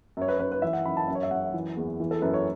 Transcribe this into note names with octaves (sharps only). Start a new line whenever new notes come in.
F#2 C#5
B4
F#2 B4
B4
E3 E5
F#5
F#2 B5
A5
F#2 E5
C#5
E5
F#2 F#5
E3
E2
E3
A4
F#2 B4
C#5